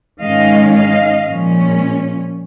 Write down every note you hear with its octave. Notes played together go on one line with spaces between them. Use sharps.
G#2 D#3 G#3 C#4 D#5 F5
D#5 F5
A#2 F3 G#3 C#4